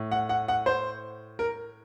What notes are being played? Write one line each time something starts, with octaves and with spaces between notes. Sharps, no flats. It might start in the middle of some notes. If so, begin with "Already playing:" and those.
Already playing: A2
F#5
F#5
F#5
C5
A#4